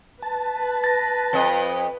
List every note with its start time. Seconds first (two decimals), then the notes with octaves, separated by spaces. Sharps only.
0.22 B4 A5
0.84 A6 A#6
1.33 F2 D#5